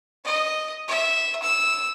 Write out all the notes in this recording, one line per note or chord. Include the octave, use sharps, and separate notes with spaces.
D#5
E5
E6